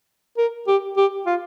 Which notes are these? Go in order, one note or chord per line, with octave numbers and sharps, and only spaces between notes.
A#4
G4
G4
F4